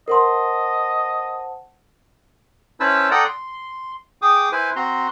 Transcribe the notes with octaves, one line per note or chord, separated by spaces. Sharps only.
A#4 C5 D#5 F#5 A5 C6
C#4 E4 B4 C5 A5 E6
A4 D5 F#5 G5 A#5 D#6
C6
G#4 G5 D6 D#6
E4 B4 C5 G#5
C4 F#4 A#5 C6